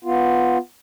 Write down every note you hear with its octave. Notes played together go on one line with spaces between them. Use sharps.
B3 F4